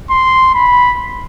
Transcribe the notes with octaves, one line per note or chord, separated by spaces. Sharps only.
C6
B5